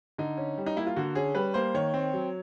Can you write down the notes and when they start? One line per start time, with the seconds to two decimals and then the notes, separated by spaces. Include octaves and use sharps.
0.18 D3 D#4
0.38 C#4
0.57 G3
0.66 D#4
0.76 A#3 E4
0.87 F4
0.96 D3 F#4
1.15 C#4 G#4
1.35 G3 B4
1.54 A#3 C5
1.74 D#3 C#5
1.94 C4
2.13 F#3